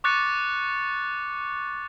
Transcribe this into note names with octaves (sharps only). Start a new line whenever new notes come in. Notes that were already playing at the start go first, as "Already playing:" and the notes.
C#6 D6 F#6 A6 C#7